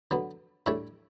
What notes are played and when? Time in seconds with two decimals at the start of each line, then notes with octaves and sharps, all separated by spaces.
0.11 D3 F#3 B3
0.66 A2 G3 D4 C#5 E5